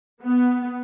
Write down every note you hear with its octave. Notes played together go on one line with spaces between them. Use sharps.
B3